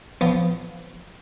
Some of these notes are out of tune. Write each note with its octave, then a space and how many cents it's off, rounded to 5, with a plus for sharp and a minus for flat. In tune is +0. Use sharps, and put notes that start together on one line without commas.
F3 +0 B3 +10